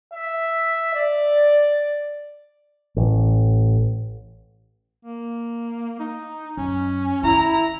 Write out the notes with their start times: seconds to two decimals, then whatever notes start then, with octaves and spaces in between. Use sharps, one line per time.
0.14 E5
0.95 D5
2.97 A1
5.05 A#3
5.99 D#4
6.57 F#2 C#4
7.23 D#3 E4 A#5